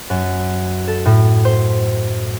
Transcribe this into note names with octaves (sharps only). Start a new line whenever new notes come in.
F#2
A4
A2
C5